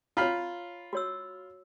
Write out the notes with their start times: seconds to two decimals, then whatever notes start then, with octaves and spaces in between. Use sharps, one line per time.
0.17 F4 C#5 A#5 B5 F6
0.93 F#4 C#5 E6